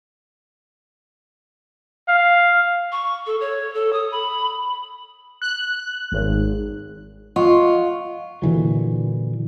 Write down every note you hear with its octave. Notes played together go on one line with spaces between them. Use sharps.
F5
C#6
A4
C#5
A4
D#6
B5
F#6
G#1
F4 D#5 F#5 C#6
A#2 D3 E3 F#3